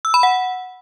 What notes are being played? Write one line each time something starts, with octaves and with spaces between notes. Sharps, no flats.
E6
B5
F#5